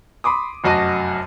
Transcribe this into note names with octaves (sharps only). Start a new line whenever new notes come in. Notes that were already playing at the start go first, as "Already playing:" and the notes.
B5 C6 D6 D#6
F1 F#2 F#4 D#5 A5 D#7